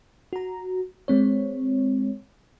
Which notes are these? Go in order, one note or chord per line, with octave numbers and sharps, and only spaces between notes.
F#4 A#5
G#3 C4 C#5